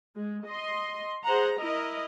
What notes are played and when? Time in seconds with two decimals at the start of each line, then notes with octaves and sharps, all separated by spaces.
0.16 G#3
0.45 D#5 C6
1.24 G#4 C5 F#5 A#5
1.58 E4 A#4 D#5